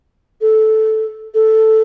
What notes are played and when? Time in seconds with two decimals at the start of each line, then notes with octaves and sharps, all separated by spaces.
0.41 A4
1.34 A4